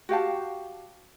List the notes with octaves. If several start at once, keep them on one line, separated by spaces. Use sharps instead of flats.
F#4 G4 F5 A5